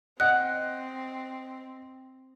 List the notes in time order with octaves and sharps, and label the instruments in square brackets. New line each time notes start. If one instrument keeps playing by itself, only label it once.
[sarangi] C4 [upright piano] D#5 [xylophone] F#5 F#6